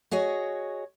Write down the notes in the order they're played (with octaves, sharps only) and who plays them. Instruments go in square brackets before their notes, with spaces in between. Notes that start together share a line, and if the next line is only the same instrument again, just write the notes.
[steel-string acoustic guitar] F#4 G#4 C#5 D#5